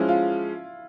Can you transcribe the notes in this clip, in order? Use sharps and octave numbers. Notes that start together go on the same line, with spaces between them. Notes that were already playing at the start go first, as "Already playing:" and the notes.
Already playing: F3 G#3 C#4 E4
F4